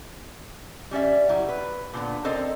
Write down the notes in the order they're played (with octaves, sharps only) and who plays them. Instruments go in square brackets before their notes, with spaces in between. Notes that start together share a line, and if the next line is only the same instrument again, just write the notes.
[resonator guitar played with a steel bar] G3 C#4 D5 E5
F#3 G3 E4
B4
A#2 D3 B3
C4 A4 A#4 C5 D5 D#5